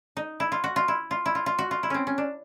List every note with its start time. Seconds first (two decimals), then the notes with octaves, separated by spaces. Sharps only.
0.17 D#4
0.40 E4
0.52 F4
0.64 F#4
0.76 F4
0.88 E4
1.11 F4
1.26 E4
1.35 F4
1.46 F4
1.59 F#4
1.71 F4
1.83 E4
1.90 C4 C#4
2.07 C#4
2.18 D4